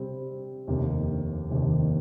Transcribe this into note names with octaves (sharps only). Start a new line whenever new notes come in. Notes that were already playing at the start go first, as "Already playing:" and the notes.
Already playing: C3 G3 C4
F1 D#2 D#3 A#3 D4
F1 D#2 D#3 A#3 D4